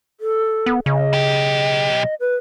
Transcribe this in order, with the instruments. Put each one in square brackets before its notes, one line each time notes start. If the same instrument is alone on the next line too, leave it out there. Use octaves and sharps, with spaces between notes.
[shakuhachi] A4
[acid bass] B3
[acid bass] C#3 [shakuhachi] D#5
[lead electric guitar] B1 G4
[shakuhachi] B4